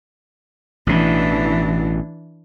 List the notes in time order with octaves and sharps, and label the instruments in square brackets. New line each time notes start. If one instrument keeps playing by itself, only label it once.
[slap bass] A1 B2 [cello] E3 D4